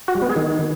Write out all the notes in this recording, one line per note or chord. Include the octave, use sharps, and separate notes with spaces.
F#4
G3
B3
G#4
D#3